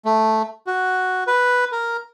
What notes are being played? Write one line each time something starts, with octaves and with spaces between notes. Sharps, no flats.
A3
F#4
B4
A#4